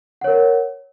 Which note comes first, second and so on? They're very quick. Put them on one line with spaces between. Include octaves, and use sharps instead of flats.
F#5 C#5 A#4